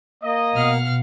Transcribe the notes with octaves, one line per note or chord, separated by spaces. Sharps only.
A#3 D#5
B2 F5 F#5 F6